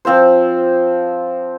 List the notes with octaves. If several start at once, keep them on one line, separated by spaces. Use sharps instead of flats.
F3 C4 F4 C5